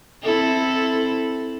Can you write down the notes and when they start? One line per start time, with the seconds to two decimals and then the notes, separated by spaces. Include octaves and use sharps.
0.23 C4 E4 A4